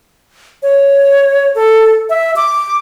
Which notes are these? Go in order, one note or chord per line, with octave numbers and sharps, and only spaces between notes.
C#5
A4
E5
D6